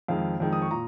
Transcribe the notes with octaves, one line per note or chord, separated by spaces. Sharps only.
F2 D#3 G#3 F5
F2 D#3 G#3
D#6
C#6
A#2 A#5